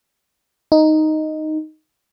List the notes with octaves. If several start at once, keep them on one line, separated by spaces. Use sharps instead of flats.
D#4